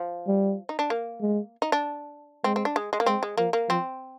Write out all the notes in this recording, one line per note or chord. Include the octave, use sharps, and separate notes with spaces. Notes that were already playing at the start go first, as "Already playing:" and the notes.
Already playing: F3
G3
D#4
D4
A#3
G#3
D#4
D4
G#3 C4
C4
D4
G#3
G#3
A#3
G#3 C4
G#3
F3 A#3
A#3
F3 C4